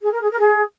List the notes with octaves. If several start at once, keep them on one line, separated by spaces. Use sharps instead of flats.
G#4
A#4
G#4
A#4
G#4